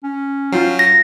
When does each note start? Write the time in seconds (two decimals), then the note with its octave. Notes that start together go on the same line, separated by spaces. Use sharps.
0.03 C#4
0.52 F#3 F4 G5 C7
0.79 A#6